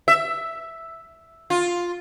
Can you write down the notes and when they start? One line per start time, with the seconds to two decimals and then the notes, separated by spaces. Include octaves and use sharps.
0.08 E5
1.50 F4